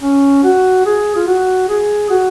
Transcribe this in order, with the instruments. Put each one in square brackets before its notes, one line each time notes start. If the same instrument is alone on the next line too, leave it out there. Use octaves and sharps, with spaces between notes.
[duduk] C#4
F#4
G#4
F4
F#4
G#4
F#4